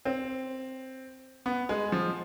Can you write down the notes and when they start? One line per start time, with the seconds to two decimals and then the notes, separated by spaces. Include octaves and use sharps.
0.05 C4
1.46 B3
1.69 G#3
1.92 F3